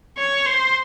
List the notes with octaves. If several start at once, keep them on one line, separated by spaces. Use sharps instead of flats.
C#5
C5